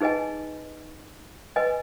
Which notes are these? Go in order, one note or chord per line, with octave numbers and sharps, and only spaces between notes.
D#4 G#4 B4 D#5 G#5
B4 D#5 G#5